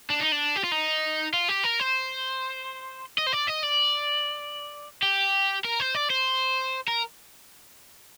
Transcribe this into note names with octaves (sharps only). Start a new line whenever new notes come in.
D4
D#4
D4
G4
F4
D#4
F4
G4
A#4
C5
D#5
C5
D5
D#5
D5
G4
A#4
C5
D5
C5
A#4